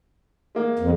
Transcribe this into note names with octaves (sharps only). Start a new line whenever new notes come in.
G#3 A#3
F2